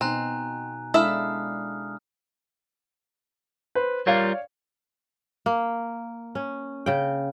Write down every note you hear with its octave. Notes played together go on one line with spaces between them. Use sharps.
B2 B3 C4 D#4 G#5 A#5 F#6
G#3 D4 E4 A4 E5 F5 D#6 F6
B4 C5
G3 F4 A#4 C#5 D5 F5
A#3
C#4
C#3 G5